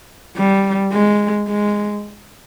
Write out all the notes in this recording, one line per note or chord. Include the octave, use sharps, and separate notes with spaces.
G3
G#3
G#3